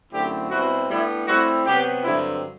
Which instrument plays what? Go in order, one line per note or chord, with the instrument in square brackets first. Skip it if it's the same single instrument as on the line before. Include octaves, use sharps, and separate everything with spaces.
[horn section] F#2 D3 A3 C4 E4 G4
B2 G3 C4 E4 F#4
A2 G3 B3 D4 E4
A2 G3 C4 E4 F#4
C3 F#3 B3 G4
G2 D3 F#3 C4 E4